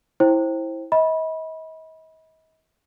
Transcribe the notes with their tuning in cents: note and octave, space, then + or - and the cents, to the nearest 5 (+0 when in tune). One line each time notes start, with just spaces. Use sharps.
E4 -10 C5 +20 G5 +0
D#5 +40 B5 -20